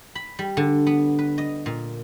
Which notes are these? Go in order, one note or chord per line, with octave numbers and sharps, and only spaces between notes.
B5
G3
D3
B3
B4
D#5
A#2